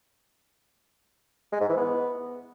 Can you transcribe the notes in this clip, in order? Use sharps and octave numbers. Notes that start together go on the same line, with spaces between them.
G#3
G#2
E3
B3